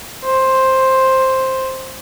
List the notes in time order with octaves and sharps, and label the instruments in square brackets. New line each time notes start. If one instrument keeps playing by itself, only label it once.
[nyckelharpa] C5